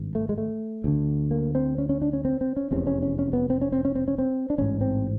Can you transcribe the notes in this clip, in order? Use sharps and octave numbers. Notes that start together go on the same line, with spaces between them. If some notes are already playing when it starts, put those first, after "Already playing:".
Already playing: G#1 G2
A3
G#3
A3
D2 D3
A#3
C4
C#4
C#4
D4
C#4
C4
C4
C#4
F1 E2 C3 C#4
C#4
C#4
C#4
B3
C4
C#4
C4
C#4
C4
C#4
C4
D4
A1 G#2 C#4
C4